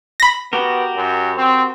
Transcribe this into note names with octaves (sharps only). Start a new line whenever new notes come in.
B5 A#6
B3 F#4 G4 A#4
F#2
C4